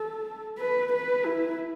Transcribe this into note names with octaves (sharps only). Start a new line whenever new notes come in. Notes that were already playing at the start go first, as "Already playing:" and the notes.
Already playing: A4
B4
B4
E4